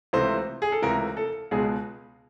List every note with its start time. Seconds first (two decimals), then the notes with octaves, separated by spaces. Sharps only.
0.13 C#2 C3 E3 A3 C5
0.62 G#4
0.72 A4
0.82 C#2 C3 E3 A3 A#4
1.17 A4
1.51 C#2 B2 G#3 G#4